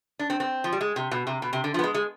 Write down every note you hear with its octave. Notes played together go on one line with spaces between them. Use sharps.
D4
C4
C4
F3
G3
G#3
C3
B2
C3
B2
C3
D3
F3
B3
G#3
G#3